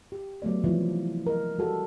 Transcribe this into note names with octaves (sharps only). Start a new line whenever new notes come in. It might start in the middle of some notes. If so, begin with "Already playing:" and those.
G4
F#3 A3 B3 D5
C3 E3 F3 E4
A#4 D#5
G3 F#4 A4